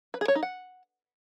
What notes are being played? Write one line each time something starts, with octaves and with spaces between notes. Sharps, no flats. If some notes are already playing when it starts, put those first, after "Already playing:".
B4
G#4
C#5
D#4
F#5